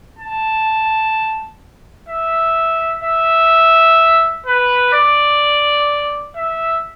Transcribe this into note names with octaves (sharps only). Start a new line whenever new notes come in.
A5
E5
E5
B4
D5
E5